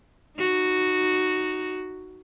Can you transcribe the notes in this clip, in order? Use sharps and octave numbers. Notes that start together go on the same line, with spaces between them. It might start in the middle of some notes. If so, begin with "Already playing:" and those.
D#4 F#4